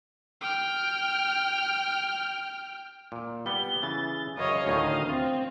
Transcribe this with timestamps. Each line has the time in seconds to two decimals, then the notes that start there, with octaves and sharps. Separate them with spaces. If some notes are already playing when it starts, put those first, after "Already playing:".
0.41 G5 F6
3.12 A#2
3.46 G3 B3 G7
3.82 C#3 E3 A6
4.37 F#2 C#3 C#5 D#5 F5
4.66 D2 A2 D#3 D#5
5.09 C4 F4